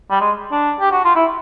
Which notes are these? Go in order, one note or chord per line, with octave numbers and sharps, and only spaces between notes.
G3
G#3
D4
G4
F#4
F4
E4